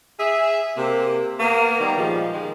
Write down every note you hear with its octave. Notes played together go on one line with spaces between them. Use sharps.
G#4 E5
C3 A#3
A#3 B3
D#3 G3
A#2 F3 G3 G#3
D#3 G#3